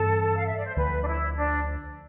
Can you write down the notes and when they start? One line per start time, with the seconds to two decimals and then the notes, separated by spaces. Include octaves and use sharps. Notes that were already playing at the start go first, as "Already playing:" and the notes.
Already playing: G2 E3 G3 C4 A4
0.37 F5
0.46 E5
0.57 D5
0.66 C5
0.76 D2 D3 F3 B4
1.03 D4
1.07 E4
1.37 D4